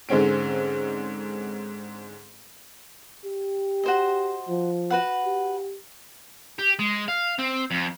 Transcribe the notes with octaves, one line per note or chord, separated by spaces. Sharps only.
G#2 D3 G#3 C4 C#4 D7
G4
F#4 C5 D#5
F3
F#4 B4 F#5
G4
G4
G#3
F5
C4
F2